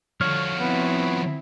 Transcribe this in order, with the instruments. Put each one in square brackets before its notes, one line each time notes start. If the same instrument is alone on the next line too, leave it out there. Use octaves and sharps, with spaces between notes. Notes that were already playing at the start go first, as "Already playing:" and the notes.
[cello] D3 [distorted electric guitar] F3 F#4 [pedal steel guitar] C#5 F6
[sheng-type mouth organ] B3 [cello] C4 E4